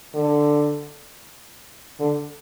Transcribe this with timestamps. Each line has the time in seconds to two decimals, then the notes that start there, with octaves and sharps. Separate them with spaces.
0.15 D3
2.00 D3